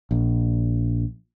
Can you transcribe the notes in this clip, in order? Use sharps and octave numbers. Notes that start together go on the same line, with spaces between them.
A#1